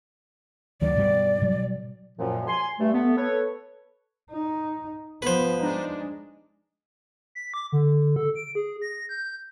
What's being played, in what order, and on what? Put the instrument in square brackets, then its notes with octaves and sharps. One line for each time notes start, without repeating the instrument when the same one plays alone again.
[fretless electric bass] D2 D#3 F#3 [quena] D5
[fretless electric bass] G2 B2 G3
B2 F#3 G3
[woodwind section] F#2 A#2 F3
G#5 C6
G2 A3
A3 B3
A4 B4 C#5
[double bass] D#4
[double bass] F3 B3 [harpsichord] B4 C5
[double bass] G#3 [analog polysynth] D4 D#4
[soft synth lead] B6
D6
D3
A4
D7
G#4
A#6
G6